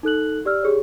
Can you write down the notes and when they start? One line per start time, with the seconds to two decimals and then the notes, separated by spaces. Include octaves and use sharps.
0.03 D#4 A4 F#6 F#7
0.45 G4 D5 E6 F6
0.63 G4 G#4 C#5